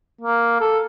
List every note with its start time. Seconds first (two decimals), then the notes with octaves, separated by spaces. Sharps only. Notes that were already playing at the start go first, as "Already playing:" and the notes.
0.21 A#3
0.60 A4